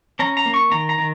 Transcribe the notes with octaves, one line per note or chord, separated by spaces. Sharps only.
C#4 A#5
A#5
A#3
C#6
D#3 A#5
A#5
D#3